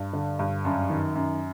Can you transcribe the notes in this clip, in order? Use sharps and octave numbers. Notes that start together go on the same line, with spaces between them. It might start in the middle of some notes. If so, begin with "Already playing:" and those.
Already playing: G2
D3
G2
F#2
D#3
F#2